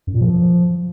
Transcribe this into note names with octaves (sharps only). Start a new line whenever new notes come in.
F#2
A#2
F3